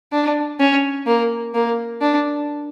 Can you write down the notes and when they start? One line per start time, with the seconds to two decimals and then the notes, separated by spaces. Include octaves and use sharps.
0.12 D4
0.60 C#4
1.07 A#3
1.54 A#3
2.01 D4